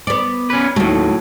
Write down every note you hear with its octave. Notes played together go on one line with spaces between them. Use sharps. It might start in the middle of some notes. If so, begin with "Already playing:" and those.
B3 D5
C#4 B4
D#2 A2 F#3 A3